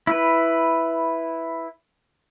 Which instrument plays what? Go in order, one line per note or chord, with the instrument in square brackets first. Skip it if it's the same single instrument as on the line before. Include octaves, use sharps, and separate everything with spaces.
[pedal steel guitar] E4 B4